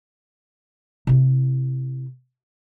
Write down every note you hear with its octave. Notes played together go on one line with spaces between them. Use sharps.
C3 E4